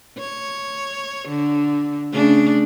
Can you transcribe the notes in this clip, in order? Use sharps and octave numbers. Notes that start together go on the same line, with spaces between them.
C#5
D3
C#3 A3 D4